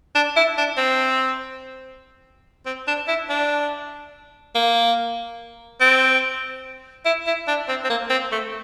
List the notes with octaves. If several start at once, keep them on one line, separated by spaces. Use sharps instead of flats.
D4
E4
D4
C4
C4
D4
E4
D4
A#3
C4
E4
E4
D4
C4
C4
A#3
C4
A3